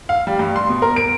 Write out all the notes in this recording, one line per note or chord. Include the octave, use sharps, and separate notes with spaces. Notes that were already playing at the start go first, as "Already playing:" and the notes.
F5
G3
G2
C6
B2
A#4
D7